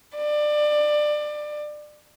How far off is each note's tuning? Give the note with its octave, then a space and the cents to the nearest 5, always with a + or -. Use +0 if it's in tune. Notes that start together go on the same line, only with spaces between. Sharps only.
D5 +25